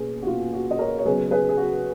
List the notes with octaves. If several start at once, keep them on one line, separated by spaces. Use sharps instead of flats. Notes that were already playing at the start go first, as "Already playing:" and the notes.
Already playing: B2 A#3 C#4 G#4 B4
F#4
B2 A#3 C#4 F4
F#4
D#5
A#4 C#5
C#5
C#3 F#3 B3 G#4 B4
G#4 B4
G#4
F#4